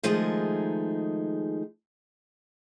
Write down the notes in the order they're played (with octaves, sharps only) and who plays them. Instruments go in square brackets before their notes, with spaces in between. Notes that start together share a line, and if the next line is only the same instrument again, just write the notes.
[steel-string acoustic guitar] D#3 F3 G#3 A3 D#4 G#4